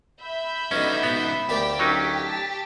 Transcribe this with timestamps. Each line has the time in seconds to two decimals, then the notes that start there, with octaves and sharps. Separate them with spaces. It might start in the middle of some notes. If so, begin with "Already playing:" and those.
0.23 E5 B5 G6
0.71 C#2 B2 D3 C#4 D#4
1.03 B2 B3
1.49 D2 A#3 G4 D5
1.79 F#3 C#4 D#4
2.24 A5